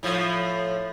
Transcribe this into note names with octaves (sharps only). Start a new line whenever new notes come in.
A2 F3